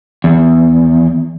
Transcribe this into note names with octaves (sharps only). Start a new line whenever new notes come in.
E2